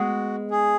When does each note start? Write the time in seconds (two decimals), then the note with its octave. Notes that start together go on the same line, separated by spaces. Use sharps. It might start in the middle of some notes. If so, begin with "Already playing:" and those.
Already playing: G#3 B3 F#4
0.51 G#4